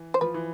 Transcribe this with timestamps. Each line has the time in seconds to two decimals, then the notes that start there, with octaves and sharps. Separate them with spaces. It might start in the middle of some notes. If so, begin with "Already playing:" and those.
Already playing: E3
0.14 C5
0.21 F3 B4
0.34 E3